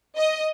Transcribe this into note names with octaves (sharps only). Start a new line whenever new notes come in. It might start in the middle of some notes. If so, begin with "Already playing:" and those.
D#5